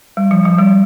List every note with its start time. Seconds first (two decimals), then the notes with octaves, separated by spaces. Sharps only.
0.17 G3
0.31 F3
0.45 F3
0.58 G3